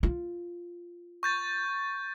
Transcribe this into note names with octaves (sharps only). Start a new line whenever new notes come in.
F4
C#6 G6 A6